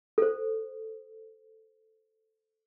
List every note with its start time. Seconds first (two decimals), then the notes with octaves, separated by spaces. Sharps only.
0.18 A4 C5